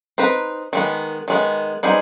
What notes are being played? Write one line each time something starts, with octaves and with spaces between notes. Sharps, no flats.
C4 D#4 B4
D#3 G#3 B3
D#3 G#3 B3
G3 B3 D#4 G#4 C5